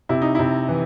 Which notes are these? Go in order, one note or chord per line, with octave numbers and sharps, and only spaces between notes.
C3 E4
D#4
C3 E4
E3